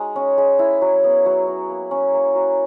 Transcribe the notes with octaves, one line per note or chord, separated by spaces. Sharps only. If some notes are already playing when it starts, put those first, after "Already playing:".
Already playing: G#3 D#4 F#4 G#4 C#5
C#4
G#3
E4
F#3
B3
F#3
F#4
A#3
C#4
A#3
F#4